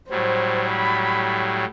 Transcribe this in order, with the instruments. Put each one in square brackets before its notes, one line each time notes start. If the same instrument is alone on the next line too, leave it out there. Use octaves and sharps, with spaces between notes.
[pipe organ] A2 F#3 G3 [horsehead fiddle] C5
[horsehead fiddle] B5